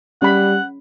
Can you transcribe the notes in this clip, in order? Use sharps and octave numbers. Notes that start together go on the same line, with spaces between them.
G3 C#4 F#5 B5